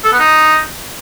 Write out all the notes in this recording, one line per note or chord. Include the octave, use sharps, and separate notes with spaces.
A4
B3
D#4